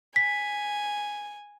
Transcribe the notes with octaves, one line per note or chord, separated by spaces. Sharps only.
G#5 B6